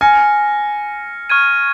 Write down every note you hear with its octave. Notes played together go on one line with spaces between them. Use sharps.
G#5 F6 A#6 C#7
C#6 F6 G#6 D#7